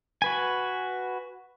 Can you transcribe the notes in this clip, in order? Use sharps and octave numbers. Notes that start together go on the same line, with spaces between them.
F#4 B4 G#5